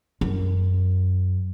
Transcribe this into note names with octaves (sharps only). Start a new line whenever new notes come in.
F#2